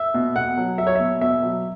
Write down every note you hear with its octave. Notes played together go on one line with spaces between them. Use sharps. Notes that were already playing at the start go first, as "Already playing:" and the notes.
Already playing: E5
B2
B2 F#5
F#3
F#3 E5
C#5
B2 E5
B2 E5
F#3